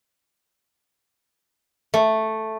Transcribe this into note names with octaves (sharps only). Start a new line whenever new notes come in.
A3